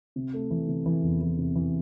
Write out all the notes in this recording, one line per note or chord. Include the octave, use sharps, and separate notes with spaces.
C3
A3
E3
C3
E3
E2
E3
C3
E3